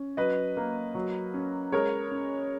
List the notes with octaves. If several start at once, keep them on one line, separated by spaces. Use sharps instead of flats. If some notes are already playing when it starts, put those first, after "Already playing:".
Already playing: C#4
F#3 B4 D#5
A#3
F#3
C#4
G#3 A#4 C#5
C#4